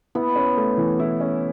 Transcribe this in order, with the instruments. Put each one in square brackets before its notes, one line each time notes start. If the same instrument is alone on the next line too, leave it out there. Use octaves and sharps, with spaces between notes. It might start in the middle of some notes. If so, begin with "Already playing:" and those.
[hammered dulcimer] B3 [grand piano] E4
[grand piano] C#4
A3
E3
E4
C#4